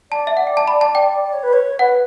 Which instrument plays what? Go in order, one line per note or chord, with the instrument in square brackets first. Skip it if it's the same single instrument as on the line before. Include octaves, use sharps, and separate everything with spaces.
[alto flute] D5 [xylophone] A5
[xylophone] E5
F#5
G5
A5
B5
A5
G5
[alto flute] D5
C#5
B4
C#5
[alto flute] B4 [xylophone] F#5